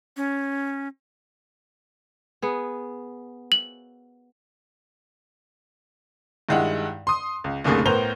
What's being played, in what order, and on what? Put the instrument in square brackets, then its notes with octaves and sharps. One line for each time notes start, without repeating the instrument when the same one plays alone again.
[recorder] C#4
[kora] B3 G#4
[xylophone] F#7
[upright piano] G2 D#3 G#3 E4 F#5
C6 D#6
C#2
F#1 C2 D3 A3 A#3 G#4
A2 B3 A#4 C5 F7 G7